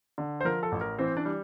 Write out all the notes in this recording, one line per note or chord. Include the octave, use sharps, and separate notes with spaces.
D3
C5
F3 A#4
A4
A1
A#4
E3 C4 C5
D4 D5
G3